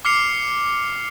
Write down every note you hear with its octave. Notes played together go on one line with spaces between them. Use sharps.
D6 F6 C7 C#7 F7